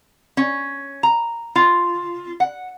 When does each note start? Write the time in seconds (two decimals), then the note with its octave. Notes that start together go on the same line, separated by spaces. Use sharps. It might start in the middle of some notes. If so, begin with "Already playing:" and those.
0.37 C#4
1.03 A#5
1.56 F4
2.40 F#5